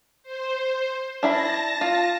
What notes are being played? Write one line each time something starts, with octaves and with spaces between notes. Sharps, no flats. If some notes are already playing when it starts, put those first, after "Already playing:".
C5
D4 E4 A5 B5 A#6
F4